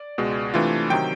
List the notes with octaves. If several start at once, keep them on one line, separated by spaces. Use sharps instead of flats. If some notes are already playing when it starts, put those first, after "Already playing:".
Already playing: D5
C#2 B2 G#3
C3 E3 A3 D4 F4
C3 D#3 F#3 G5